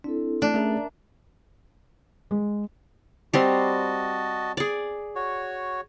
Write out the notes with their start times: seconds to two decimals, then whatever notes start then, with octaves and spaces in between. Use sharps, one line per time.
0.04 C4 D4 E4 A4
0.42 A3 D4
0.54 A3 C#4 G#4 A#4 E5 A#5
2.31 G#3
3.34 G3 C4 F#4 D#5 A5 C6
4.57 G#4 D5
5.16 F#4 C#5